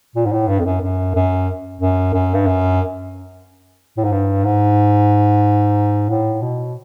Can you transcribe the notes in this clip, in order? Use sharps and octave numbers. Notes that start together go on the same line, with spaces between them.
A#2
G#2
A2
G2
F2
F#2
F#2
F#2
F#2
F#2
G2
F#2
A2
G#2
G2
G#2
A2
B2